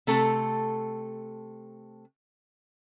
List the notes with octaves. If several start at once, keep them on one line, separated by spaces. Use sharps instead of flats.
C3 A3 A4